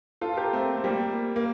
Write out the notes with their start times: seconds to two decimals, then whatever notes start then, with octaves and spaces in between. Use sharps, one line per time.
0.21 F4 A4
0.33 A4
0.37 G4 A#4
0.53 A3 C4
0.77 C4
0.84 G3 A#3
1.36 A#3